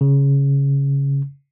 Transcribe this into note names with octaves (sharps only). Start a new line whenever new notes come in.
C#3